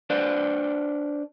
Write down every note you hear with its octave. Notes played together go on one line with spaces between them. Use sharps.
D4 B4 C5 D5